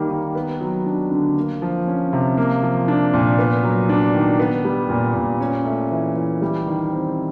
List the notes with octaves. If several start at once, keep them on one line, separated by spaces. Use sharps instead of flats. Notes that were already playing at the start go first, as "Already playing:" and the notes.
Already playing: D#3 G3 A#3
D#3
B3
F#3
D4
D3
A#3
F3
C#4
C3
A#3
F3
D4
A#2
B3
F#3
D4
D#3
B3
G3
A#2
A#2
C#4
A3
E3
E3
G3
D#3
C4